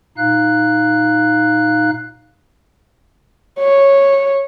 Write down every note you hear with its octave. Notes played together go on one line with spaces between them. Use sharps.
A#2 D#4 F5 F#6
C#5